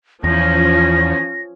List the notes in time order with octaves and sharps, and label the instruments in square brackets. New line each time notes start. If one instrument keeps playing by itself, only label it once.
[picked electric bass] E2 [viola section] F3 C#4 [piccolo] A#6